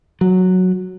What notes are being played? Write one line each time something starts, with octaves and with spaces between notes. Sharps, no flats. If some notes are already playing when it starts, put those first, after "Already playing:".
F#3